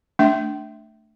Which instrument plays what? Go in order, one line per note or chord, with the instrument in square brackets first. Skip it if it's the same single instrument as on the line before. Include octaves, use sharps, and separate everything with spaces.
[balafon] A3 D4 E5